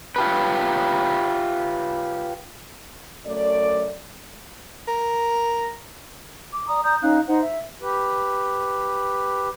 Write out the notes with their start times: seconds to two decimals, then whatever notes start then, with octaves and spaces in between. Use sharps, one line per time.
0.16 F4 G4 B4
3.26 F#2 A3 D5
4.87 A#4
6.52 D6
6.68 D5 A#5 D#6
6.84 D5 A#5 D#6 G6
7.02 C#4 D#4 F5 F#6
7.27 D#4 C5 F#5
7.42 E5
7.82 G4 B4